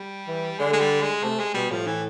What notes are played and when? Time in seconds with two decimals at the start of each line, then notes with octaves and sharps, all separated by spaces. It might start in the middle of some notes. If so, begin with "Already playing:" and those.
Already playing: G3
0.27 E3
0.59 D3 G#3
0.73 G#3
0.80 G3
1.02 G#3
1.23 C3 A3
1.39 G#3
1.54 B2 G3
1.70 A2 F3
1.87 E3